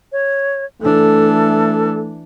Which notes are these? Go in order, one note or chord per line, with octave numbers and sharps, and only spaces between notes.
C#5
E3 A3 D4 A4